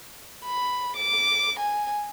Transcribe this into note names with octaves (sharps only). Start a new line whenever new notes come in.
B5
D6
G#5